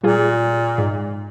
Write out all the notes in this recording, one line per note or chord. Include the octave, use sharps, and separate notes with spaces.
A#2 G3 F4 G#4
G#2